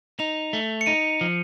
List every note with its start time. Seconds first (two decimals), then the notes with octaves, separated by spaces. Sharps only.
0.19 D#4 F7
0.53 A3
0.81 C#7
0.86 D#4 D#7
1.21 F3